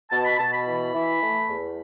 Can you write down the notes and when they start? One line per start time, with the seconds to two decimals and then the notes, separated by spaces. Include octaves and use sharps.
0.11 B2 A5
0.25 B5
0.39 B2 A5
0.52 B5
0.66 E3
0.94 E3
1.22 A3
1.49 E2